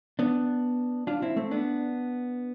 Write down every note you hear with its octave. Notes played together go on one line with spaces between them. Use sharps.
B3 D4
D4 F4
C4 E4
A3 C4
B3 D4